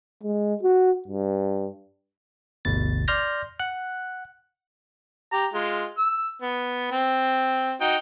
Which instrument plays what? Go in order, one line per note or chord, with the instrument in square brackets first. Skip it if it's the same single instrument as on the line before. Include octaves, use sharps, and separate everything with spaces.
[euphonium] G#3
F#4
G2
[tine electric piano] G1 D2 B2 A6
D5 C6 F6 G6 A#6
F#5 F#6
[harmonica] G4 A#5
G#3 F4
E6
B3
C4
D#4 F#4 G5